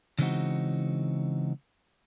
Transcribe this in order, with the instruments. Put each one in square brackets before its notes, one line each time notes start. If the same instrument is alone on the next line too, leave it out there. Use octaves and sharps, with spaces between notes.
[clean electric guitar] C#3 E3 G#3 C4 D#4 F#4